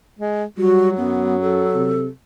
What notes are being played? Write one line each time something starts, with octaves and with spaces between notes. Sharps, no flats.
G#3
F#3 G3 F#4
F#2 B3
A4
C3